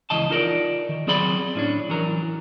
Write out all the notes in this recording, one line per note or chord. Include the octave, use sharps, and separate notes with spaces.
C#2 E3 D#5 A5
D#4 F4 A4 A#4 C5 D5
D#3
F#3 C4 G#4 D5 B5 C6
A2 C#4 D4
E3 F#3 A#4